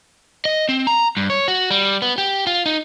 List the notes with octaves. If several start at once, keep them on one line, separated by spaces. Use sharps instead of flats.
D#5
C4
A#5
G2
C#5
F#4
G3
B3
G4
F4
D#4